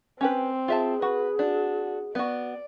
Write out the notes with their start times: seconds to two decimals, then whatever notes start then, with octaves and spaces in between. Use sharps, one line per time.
0.21 C4 C#4 G4 B4
0.68 F4 G#4 E5 A5
1.02 F#4 B4
1.39 D4 F#4
2.15 B3 F#4 D5